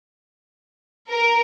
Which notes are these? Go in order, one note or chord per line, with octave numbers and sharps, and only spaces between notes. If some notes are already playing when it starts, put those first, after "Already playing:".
A#4